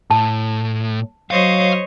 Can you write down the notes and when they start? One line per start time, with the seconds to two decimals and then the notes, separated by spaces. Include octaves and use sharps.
0.10 A2 A5
1.31 F#3 C5 C#5 D#5 F5